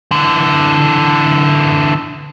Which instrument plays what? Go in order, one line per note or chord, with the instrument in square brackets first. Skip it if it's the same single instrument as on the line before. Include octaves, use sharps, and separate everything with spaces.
[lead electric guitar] D3 E3